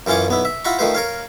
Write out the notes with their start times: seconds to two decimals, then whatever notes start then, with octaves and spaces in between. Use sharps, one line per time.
0.07 F#2 E3 C#4 F4 C#5 D6
0.28 B1 B3 E4
0.45 E5
0.65 E4 F4 F#5 A#5 B5 C#6
0.79 D#3 F3 A3 B4 C5
0.95 A#4 C#5 F5